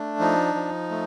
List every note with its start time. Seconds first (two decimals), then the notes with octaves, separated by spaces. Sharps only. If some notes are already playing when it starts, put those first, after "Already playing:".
Already playing: A3 D4
0.20 F3 D#4
0.55 F3
0.91 A3